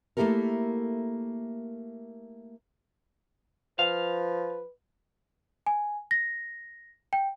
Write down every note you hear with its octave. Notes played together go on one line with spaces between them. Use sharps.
A3 A#3 E4 G4 A4 A#4
F3 B4 F5
G#5
A#6
G5